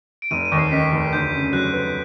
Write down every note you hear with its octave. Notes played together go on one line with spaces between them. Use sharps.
D7
F1 D#7
D#7
D#2
C7
D#3 B6
F1
D2 G6
C#3
F#3 F#6
B3